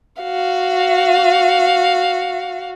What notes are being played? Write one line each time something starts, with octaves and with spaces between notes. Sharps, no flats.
F#4 F5